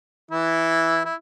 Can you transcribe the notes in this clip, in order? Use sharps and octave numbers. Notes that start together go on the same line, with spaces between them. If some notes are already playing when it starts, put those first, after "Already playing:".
E3 E4
E4